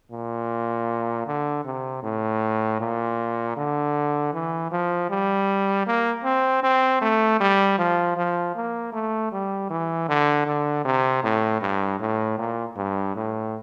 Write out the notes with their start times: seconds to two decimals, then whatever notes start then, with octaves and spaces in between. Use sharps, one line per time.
0.12 A#2
1.27 D3
1.65 C3
2.03 A2
2.80 A#2
3.57 D3
4.33 E3
4.71 F3
5.10 G3
5.87 A#3
6.24 C4
6.64 C4
7.01 A3
7.40 G3
7.78 F3
8.17 F3
8.56 A#3
8.93 A3
9.32 G3
9.70 E3
10.09 D3
10.47 D3
10.85 C3
11.23 A2
11.62 G2
12.00 A2
12.38 A#2
12.77 G2
13.15 A2